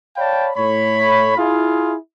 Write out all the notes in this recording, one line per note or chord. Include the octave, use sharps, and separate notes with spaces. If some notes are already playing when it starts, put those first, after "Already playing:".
C#5 D5 F5 G5 A5 B5
A2 C#5 B5
E4 F4 G#4